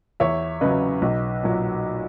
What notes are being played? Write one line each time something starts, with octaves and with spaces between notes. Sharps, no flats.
E2 C#5 E5
C#3 F#3 B4 D#5
B1
A#2 F#3